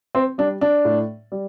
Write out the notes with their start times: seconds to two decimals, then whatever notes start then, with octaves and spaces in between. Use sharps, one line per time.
0.15 C4
0.38 G3 D4
0.61 D4
0.85 A2
1.32 G3